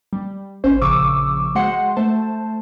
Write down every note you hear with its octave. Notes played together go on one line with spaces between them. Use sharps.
G3
G#1 C#4 C5
A#1 C#3 F3 C#6 D6 E6
G#3 F#4 C5 F#5 C6 C#7
A3 C5 A5